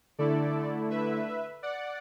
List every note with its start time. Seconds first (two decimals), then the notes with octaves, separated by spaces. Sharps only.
0.18 D3 A3 E4 A4 D5
0.90 B4 E5
1.63 D5 F#5